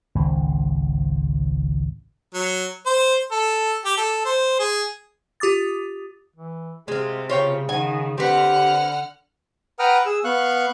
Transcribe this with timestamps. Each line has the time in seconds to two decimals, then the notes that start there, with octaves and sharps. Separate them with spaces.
0.15 G#1 C#2
2.34 F#3
2.86 C5
3.32 A4
3.85 G4
3.97 A4
4.25 C5
4.60 G#4
5.40 F4 G4 D6 D#6 A6
6.36 E3
6.88 C3 G#3 F4 G#4
7.29 C#3 F4 C#5 G5
7.69 D#3 F#5 G#5
8.18 D3 C4 G4 B4 F#5 F6
9.79 B4 F#5 G5 A#5 D#6 F6
10.06 G#4 E6
10.25 B3 F5 C#6 F#6